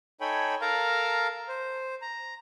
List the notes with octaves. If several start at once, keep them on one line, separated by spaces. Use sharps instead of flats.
D#4 A4 C#5 G5 G#5 B5
A4 A#4 F5 A5 A#5
C5
A#5